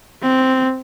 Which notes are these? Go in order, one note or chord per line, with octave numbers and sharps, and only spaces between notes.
C4